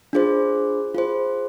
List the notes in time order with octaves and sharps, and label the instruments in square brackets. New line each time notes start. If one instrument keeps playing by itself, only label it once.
[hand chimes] D4 F4 G#4 C5
F4 G#4 C5